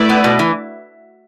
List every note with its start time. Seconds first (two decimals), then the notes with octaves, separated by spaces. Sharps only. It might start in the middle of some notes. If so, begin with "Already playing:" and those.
Already playing: A3 E4 B4 D5
0.09 B3
0.24 B2
0.39 E3